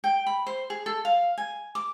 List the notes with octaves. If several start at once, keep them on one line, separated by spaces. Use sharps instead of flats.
G5
B5
C5
G#4
A4
F5
G#5
D6